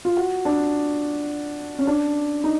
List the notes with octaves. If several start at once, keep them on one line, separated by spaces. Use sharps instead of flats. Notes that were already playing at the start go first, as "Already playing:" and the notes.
F4
F#4
D4
C#4
D4
D#4